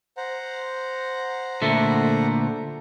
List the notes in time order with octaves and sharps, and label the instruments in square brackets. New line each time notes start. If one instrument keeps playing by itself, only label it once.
[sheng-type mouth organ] C5 F#5 A#5
[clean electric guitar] A#2 D3 A3